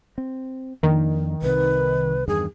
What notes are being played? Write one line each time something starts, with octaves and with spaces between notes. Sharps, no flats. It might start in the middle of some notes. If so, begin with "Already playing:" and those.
C4
F2 D#3 A#3 D4
C2 C3 B4
E2 G2 D#3 G#4